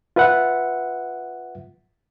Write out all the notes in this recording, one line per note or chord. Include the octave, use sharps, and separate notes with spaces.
F4 B4 E5 F#5